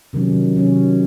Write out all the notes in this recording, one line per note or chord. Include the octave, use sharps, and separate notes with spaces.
C3 D#3 F#3 C#4
C3 D#3 F#3 C#4